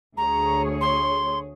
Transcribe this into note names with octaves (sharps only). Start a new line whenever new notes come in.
D2 G#4 C#5 A#5
C6